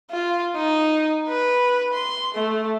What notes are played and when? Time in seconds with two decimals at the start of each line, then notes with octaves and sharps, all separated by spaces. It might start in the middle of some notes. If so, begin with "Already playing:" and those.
0.11 F4
0.56 D#4
1.28 B4
1.94 C6
2.34 A3